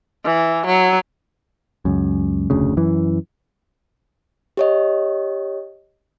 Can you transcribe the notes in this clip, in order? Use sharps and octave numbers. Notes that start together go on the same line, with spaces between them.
E3
F#3
C#2 F#2
F1 D2 C#3
F#2 E3
G4 C#5 D#5